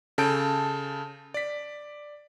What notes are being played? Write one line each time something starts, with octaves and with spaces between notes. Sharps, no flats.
C#3 A4 A5 G6 D7
D5 B6